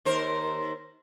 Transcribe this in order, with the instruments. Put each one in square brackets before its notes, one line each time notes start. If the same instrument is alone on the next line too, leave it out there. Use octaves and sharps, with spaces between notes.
[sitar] D#2 A#4 C5